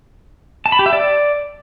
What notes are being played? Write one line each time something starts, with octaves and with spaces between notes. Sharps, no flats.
A5
B5
G4
E5
D5